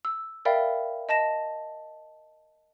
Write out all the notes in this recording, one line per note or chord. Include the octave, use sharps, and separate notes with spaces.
E6
A#4 D5 E5 F5 G5 B5
D#5 A5 A#6 E7